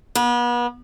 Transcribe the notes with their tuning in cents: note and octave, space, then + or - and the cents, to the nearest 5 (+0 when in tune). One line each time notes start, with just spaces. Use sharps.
B3 -35